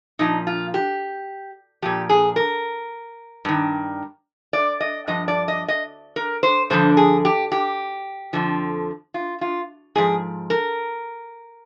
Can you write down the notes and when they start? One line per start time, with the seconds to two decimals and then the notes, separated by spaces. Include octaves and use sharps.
0.19 A#2 F3 D#4
0.47 F4
0.74 G4
1.82 A#2 F3 G4
2.09 G#4
2.36 A#4
3.45 G2 D#3
4.53 D5
4.80 D#5
5.07 G2 F3 D#5
5.28 D5
5.48 D#5
5.68 D#5
6.16 A#4
6.43 C5
6.70 G2 D3 F3 C5
6.97 G#4
7.25 G4
7.52 G4
8.33 F2 D3 F3
9.14 F4
9.41 F4
9.95 G#2 F3 G#4
10.50 A#4